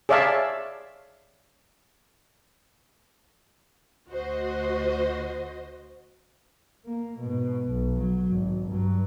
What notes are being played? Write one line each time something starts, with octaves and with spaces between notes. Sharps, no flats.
G#4 C#5 D5 E5 F5 A5
D2 F#4 C5 D#5
A#3
G#2 B2
B1
F#3
G#1
G2 F#3